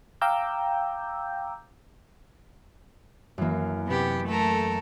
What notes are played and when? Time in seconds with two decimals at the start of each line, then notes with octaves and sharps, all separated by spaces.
0.21 F5 G5 A#5 D6 E6 G6
3.38 F#2 E3 A#3
3.86 C3 B3 G4
4.26 A3 A4 A#4